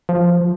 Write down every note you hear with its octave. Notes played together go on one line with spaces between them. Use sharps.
F3